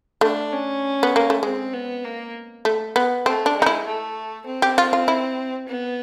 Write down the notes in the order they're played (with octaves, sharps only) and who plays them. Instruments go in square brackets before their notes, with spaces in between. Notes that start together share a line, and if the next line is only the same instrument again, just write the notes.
[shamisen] A3 [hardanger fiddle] D4
[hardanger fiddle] C#4
[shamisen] B3
A#3
A3
[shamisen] G#3 [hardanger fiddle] C4
[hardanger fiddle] B3
A#3
[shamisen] A3
B3
[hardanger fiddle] A3 [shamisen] C4
[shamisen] D4
[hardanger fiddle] G#3
[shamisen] D#4
E4
[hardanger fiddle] A3
C4
[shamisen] G4
F4
F4
E4
[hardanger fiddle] B3